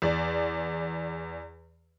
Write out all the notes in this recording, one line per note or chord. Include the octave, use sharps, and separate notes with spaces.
E2 D5